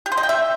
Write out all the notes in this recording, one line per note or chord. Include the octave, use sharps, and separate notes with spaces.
G4
C5
D#5
G5
E5